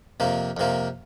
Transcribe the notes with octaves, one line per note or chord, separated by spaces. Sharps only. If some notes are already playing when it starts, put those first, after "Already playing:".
F2 C3 A#3
F2 C3 A#3